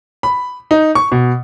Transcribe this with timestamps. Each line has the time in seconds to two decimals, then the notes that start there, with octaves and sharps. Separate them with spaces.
0.23 B5
0.71 D#4
0.95 C#6
1.12 B2